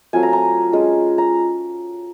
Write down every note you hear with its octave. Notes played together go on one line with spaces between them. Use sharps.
F#3 A3 C4 F4 G#5
A#5
A#5
G#3 C#4 F4
A#5